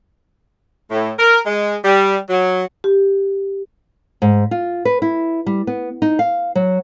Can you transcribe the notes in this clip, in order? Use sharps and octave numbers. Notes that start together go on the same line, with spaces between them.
A2
A#4
G#3
G3
F#3
G4
G#2
F4
B4
E4
G3
B3
D#4
F5
F#3